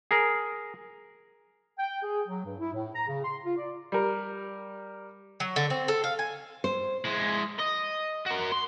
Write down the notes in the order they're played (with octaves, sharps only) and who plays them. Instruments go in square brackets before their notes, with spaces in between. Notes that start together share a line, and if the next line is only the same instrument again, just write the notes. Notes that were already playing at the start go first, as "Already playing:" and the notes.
[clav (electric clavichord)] G#4 A#4
[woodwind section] G5
G#4
F#3
G2
E4
A2
A#5
C#3
C6
F4
D5
[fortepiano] G3 A#4
[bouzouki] F#3
D3
C4
A4
F5
G#5
[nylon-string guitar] C5
[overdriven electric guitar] G#3 E4
D#5
F#4 A#4
C6